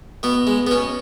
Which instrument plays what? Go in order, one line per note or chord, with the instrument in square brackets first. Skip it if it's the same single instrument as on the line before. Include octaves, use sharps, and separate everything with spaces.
[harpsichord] B2 B3
G#3
B3
B2 C#4